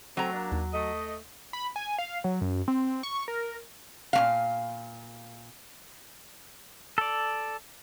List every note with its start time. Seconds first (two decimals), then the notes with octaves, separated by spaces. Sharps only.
0.17 F#3 A3 C4 A#5
0.33 A#3 D4
0.52 D#2
0.74 A3 D#5
1.53 B5
1.76 G#5
1.98 F5
2.24 F#3
2.41 F#2
2.68 C4
3.03 C#6
3.28 A#4
4.13 A#2 A#3 F5
6.98 A4 D5